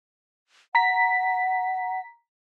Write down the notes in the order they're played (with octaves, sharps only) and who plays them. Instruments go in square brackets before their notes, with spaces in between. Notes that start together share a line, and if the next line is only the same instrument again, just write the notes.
[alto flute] F#5 [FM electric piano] A#5 B6